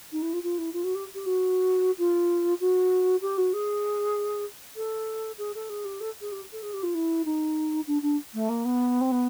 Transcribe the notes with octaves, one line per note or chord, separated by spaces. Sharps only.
D#4
E4
F4
F4
E4
F4
F#4
G4
G4
F#4
F4
F#4
G4
F#4
G#4
A4
G#4
A4
G#4
G4
A4
G#4
G4
A4
G#4
G4
F4
E4
D#4
D4
D4
A3
A#3
B3
C4
B3